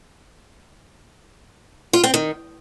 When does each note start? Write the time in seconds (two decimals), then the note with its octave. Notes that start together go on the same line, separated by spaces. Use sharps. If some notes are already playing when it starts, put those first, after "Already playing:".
1.93 F4
2.04 C4
2.14 D#3